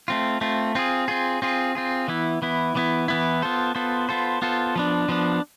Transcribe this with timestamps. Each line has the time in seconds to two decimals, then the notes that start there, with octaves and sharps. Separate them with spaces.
0.08 A3 C4 F4
0.41 A3 C4 F4
0.75 C4 F4 G#4
1.08 C4 F4 G#4
1.42 C4 F4 G#4
1.75 C4 F4 G#4
2.08 E3 B3 E4
2.42 E3 B3 E4
2.75 E3 B3 E4
3.08 E3 B3 E4
3.42 B3 F4 A4 C5
3.75 B3 F4 A4 C5
4.09 B3 F4 A4 C5
4.42 B3 F4 A4 C5
4.76 F3 B3 D4
5.09 F3 B3 D4